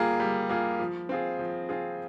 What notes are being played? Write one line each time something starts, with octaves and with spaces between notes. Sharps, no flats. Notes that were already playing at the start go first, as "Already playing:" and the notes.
Already playing: G3 A#3 F4 G#4
G3
A#3 F4 G#4
F3
C4 F4 G#4
F3
C4 F4 G#4